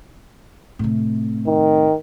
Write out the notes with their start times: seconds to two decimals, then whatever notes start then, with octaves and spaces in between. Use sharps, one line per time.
0.79 A2 C3
1.47 D#3